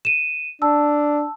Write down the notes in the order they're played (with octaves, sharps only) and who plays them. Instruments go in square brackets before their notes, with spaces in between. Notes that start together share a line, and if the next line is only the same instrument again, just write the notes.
[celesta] D#7 E7
[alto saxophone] D4 [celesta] A5 E6